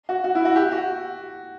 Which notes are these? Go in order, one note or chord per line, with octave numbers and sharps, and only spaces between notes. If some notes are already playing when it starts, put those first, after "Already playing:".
F#4
F#4
E4
F#4
G4
F#4